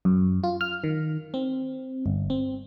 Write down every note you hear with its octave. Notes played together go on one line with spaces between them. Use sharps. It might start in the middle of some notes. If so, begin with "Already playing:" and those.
F#2
F4
F6
D#3
C4
G1
C4